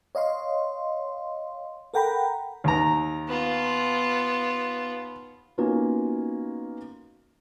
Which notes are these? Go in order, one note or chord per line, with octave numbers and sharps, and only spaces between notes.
C#5 D#5 F5 C6
A4 A#4 F#5 G5 A#5 B5
D#2 A#5
B3 F4
A#3 B3 C#4 D#4 F4 F#4